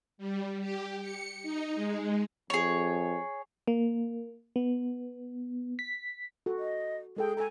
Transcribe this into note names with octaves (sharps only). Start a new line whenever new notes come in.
G3
G4
C#7
D#4
G#3
F2 G#4 C#5
A#3
B3
B6
F#4 A4
D#5
G#3 G#4 A4 G5
A4 G#5 A#5